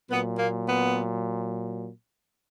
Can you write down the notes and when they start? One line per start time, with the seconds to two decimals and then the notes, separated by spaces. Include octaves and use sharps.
0.11 A#2 F#3 B3
0.38 A#3
0.67 B3